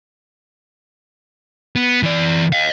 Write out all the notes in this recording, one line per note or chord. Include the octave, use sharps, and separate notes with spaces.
B3
E3 D5
D#5 F5